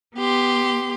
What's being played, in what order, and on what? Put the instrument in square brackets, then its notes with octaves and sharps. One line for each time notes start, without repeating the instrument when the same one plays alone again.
[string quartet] B3 G4 C6